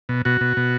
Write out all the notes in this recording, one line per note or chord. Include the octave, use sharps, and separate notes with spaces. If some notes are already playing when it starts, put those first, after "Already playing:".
B2
B2 F#4
B2
B2